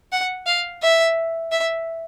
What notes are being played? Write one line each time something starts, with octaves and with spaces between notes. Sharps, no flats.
F#5
F5
E5
E5